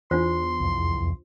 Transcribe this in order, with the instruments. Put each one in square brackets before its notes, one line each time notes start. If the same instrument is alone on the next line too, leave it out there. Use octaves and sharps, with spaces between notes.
[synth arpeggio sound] E2 [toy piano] D4 F4 C5 [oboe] C6
[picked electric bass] C2 F2